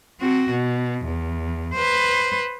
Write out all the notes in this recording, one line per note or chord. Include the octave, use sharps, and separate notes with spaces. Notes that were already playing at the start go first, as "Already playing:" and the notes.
C4 F#4
B2
E2
B4 C5